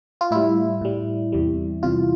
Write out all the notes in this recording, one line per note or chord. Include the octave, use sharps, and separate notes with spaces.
F4
A2 G3 E4
A2 G3
E2 C3 G3
E2 C3 G3 F4